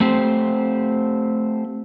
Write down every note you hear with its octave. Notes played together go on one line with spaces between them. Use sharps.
A3 C4 G4 C5